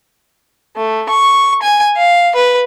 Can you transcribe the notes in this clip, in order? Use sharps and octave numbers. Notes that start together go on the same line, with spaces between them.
A3
C#6
G#5
F5
B4